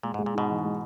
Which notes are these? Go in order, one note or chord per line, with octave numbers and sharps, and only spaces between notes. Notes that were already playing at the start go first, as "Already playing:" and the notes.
A#2 G#3
G#2
G#3
A#2
G#2 B2 D#4
E3
G#3